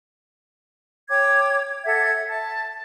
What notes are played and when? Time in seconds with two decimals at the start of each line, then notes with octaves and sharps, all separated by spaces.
1.09 C#5 G5 D6 G#6
1.85 A4 E5 F#5 G#6
2.28 A5